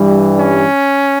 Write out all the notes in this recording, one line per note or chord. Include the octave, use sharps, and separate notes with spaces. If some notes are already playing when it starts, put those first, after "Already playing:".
Already playing: G2 E3 G3
C#4